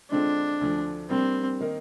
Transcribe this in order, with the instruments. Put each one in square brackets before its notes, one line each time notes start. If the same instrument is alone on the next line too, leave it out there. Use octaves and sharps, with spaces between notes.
[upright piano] D3 G#3 C4 F4 [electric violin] D4
[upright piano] D2 D3 F3
[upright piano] G3 A#3 D4 G4 A#4 [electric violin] C4
[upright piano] D#3 A#3 D#4 A#4